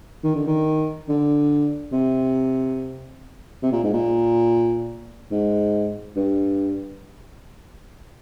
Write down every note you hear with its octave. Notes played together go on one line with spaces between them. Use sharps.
D#3
D3
D#3
D3
C3
C3
A#2
G#2
A#2
G#2
G2